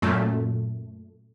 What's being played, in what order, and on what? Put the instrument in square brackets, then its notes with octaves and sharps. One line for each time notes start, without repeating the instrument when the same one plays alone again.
[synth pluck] F#2 A#2 A3